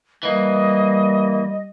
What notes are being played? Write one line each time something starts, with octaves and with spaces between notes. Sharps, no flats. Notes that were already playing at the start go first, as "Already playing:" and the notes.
E3 G3 A#3 D#5